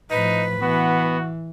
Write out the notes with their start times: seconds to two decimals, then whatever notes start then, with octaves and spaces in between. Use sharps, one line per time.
0.11 A2 F3 D#4 B4
0.62 E3 B3 F#4